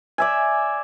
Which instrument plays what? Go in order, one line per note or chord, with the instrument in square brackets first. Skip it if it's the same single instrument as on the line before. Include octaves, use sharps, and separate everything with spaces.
[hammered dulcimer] D5 E5 G#5